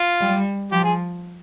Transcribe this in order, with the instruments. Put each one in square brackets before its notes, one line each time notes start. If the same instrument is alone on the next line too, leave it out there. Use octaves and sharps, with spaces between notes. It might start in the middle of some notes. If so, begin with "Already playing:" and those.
Already playing: [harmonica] F4
[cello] G3
[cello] F3 [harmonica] G4
[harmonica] G#4